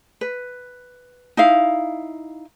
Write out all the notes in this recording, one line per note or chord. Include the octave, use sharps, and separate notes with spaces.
B4
D#4 E4 F5